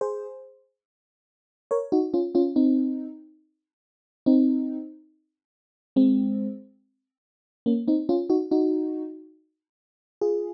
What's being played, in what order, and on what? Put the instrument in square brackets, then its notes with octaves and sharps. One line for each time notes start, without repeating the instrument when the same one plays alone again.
[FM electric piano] G#4 C5
A#4 C#5
D#4 F#4
C#4 F4
C#4 F4
C4 D#4
C4 D#4
G#3 C4
A#3 C#4
C4 D#4
C#4 F4
D#4 F#4
D#4 F#4
F4 G#4